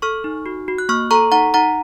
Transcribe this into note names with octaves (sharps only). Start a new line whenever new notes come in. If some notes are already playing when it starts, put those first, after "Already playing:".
A4 C#6 F6
D#4
F#4
F#4
F#6
A#3 C#6 F6
A4 A#5 C#6
D#4 F#5 A#5
D#4 F#5 A#5